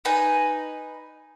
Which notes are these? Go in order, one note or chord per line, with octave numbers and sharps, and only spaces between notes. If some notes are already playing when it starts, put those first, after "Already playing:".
D#4 B4 G#5